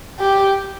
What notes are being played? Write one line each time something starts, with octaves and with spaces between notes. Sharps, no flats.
G4